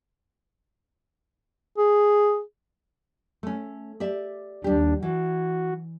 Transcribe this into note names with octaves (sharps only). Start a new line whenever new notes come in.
G#4
A3 C#4
G4 D5 E5
D#2 G3 D4 G4
E3 F#4